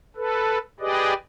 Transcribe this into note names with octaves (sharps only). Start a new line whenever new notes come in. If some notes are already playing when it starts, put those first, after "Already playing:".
A4 B4
G4 G#4 B4 D5 D#5